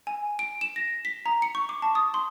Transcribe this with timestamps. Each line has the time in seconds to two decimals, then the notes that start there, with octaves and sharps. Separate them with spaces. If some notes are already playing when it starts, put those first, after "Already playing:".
0.07 G#5
0.39 D7
0.61 E7
0.76 A#6
1.05 B6
1.26 A#5
1.42 C#7
1.55 C#6
1.69 D6
1.82 A5
1.95 D#6
2.14 C6